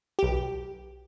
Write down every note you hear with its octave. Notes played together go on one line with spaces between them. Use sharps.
B1 G4